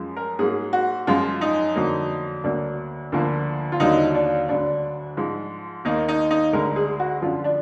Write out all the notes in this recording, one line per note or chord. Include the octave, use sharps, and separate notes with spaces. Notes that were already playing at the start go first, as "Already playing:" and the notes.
Already playing: F#2 F3 G#3
A#4
G#2 F#3 A#3 G#4
F#4
F#2 F3 G#3 F4
D#4
F2 D3 F#3 A#3
D2 D3 F#3 A#3 D4
D2 D3 F3 A#3
F4
D#2 D3 F#3 A#3 D#4
D4
D2 D3 F#3 D4
G#2 F3 G#3
D#2 D#3 A#3 D#4
D#4
D#4
D2 D3 G#3 A#4
G#4
F#4
F#2 D3 F3 F4
D4